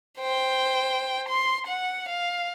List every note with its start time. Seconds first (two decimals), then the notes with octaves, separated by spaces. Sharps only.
0.18 C5 G5
1.29 C6
1.67 F#5
2.09 F5